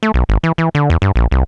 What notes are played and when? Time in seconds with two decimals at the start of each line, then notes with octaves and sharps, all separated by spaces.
0.03 A3
0.14 B1
0.29 G#1
0.44 E3
0.58 E3
0.75 D3
0.90 E2
1.02 G2
1.16 A#1
1.31 C2